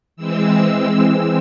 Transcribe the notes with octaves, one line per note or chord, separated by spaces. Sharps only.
E3 G#3 C4 E6
E6